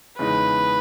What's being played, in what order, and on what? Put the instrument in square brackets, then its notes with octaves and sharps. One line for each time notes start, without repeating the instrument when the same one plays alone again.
[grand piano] E2 C#3 G#3 D#4 [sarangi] B4